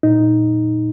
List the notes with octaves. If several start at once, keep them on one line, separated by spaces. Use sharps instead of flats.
A#2 D#4